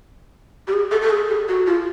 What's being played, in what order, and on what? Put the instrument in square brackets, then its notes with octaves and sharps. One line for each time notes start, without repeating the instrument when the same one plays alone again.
[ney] G4
G#4
A4
A4
G#4
G4
F#4
F4